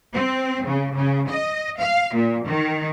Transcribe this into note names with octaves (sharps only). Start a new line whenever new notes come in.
C4
C#3
C#3
D#5
F5
A#2
D#3